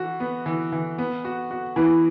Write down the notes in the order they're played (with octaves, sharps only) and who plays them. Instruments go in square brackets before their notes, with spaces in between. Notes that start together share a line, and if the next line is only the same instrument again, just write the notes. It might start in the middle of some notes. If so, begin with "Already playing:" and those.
Already playing: [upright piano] E3 F#4
B3
E3
E3
B3
F#4
F#4
[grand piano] E3 [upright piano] B3